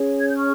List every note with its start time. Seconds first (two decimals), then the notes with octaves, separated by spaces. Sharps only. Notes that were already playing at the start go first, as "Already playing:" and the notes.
Already playing: C#4 G#4 C#5
0.19 G#6
0.27 G6
0.37 C#6 F6